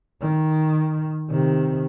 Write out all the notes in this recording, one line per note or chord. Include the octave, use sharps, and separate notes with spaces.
D#3
C3 D#3